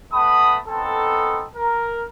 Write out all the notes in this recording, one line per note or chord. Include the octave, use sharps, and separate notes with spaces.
A3 B3 F#5 A5 B5 D#6
B3 C4 D#4 A4
A#4